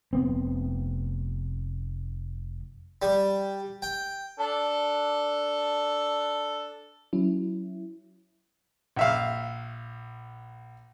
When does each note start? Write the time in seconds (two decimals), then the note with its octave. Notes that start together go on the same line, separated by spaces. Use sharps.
0.13 F1 B3 C4
3.02 G3
3.82 G5
4.39 D4 A4
7.13 F#3 C#4 E4
8.96 A#1 E5 F5